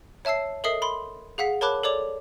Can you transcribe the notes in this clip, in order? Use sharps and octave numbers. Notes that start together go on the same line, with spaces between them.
C#5 E5 A5 E6 C7
A4 A#4 D#5 E5 D#6 C7
B5 C6
G#4 F5 F#5 B6
A#4 C#5 A5 B5 D6 F#6
A4 C#5 D5 D6 F7